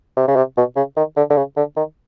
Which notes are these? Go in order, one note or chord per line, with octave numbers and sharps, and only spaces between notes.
C3
C#3
C3
B2
C#3
D#3
D3
D3
C#3
D3
D#3